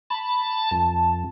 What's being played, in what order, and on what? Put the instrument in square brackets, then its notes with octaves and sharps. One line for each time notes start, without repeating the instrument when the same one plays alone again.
[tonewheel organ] A5 [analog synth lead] B5
[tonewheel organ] F2 [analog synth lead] A5